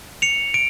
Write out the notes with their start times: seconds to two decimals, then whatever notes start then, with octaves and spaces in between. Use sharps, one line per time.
0.22 C#7 F7
0.54 D7